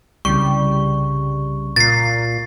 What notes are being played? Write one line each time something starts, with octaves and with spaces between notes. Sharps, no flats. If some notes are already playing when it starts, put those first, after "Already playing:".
C2 C#3 G3 C#6
A#2 A6 C7